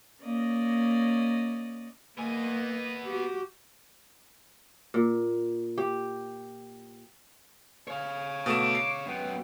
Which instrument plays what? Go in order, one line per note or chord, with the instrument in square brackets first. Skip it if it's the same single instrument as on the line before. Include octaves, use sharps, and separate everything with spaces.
[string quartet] A#3 C#4 D5 D#5
[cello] A#3 D#5 [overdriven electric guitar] B3 G#5
[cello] F#4 G4
[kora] A#2
G4
[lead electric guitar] C#5 F5 [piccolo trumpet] G#5
[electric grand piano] B2 A3 E7 [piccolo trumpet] D6
[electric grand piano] C7
[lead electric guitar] F#2 B3 [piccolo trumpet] G5